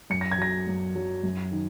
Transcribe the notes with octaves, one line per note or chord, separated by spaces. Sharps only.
F#2 C#7
A#6
G#6
F#3 A#6
F#2
F#3
F#2
D#3